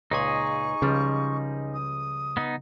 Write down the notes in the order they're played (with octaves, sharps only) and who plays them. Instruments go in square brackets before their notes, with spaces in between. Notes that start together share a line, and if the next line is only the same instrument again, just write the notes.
[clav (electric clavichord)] C#2 A#2 G#5 [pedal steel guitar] D#4 G#4 [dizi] C#6
[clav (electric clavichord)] C#2 F3 G3 [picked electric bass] C#3
[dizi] D#6
[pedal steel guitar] B3 D#4